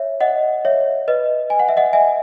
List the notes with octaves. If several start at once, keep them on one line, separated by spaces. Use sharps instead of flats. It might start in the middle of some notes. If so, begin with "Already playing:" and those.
Already playing: C#5 E5
D#5 F#5
C#5 E5
B4 D#5
G#5
F#5
E5
D#5 F#5
E5 G#5